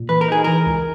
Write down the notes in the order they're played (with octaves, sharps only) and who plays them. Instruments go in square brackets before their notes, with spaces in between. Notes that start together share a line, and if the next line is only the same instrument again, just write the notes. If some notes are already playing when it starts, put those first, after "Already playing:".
Already playing: [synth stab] A#2
[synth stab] E3 [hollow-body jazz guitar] B4
[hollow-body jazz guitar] A#4
[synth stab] D#4 [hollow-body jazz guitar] G#4
[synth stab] E3 [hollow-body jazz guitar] A#4
[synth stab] C#2